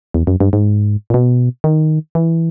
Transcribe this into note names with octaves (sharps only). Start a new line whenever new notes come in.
E2
F#2
G2
G#2
A#2
B2
D#3
E3